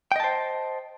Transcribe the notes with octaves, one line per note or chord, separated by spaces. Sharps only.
C5 D#5 G5 A5